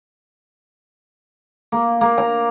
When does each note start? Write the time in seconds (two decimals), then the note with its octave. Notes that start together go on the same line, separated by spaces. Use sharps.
1.72 A#3
2.01 A#3
2.18 A#5